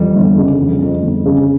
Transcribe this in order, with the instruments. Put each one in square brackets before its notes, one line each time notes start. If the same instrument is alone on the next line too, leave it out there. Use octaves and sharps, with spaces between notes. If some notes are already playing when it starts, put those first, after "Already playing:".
Already playing: [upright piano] F2 [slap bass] E3 G3
[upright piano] G1
C#3
F2
F2
G1
C#3